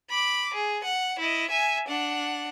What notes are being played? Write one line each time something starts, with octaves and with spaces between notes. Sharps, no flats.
B5 D6
G#4
F#5
E4 D#5
E5 G#5
D4 F#5